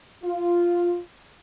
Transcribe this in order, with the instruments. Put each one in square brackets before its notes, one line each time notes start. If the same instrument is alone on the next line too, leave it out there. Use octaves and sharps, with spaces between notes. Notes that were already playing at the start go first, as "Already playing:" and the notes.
[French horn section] F4